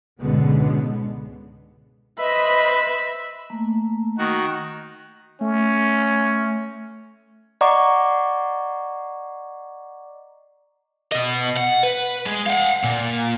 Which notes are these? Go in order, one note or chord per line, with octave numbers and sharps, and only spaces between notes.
C#2 G#2 B2 D3 G#3 B3
B4 C5 D#5 E5
A3 A#3
D#3 F#4
A3 C#4
D5 D#5 F#5 A#5 C#6 D6
B2 D#5
F#5
B4
G#3
F5 F#5
A#2